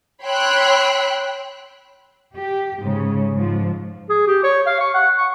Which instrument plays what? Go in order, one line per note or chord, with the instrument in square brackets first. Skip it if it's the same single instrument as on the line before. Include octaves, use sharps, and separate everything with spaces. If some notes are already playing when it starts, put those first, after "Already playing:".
[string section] C#5 G5 B5 C6 E6 F#6
[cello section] G4
G#2 C#3
G#2 F3
[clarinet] G#4
G4
C#5
F5
C#6
F#5
C#6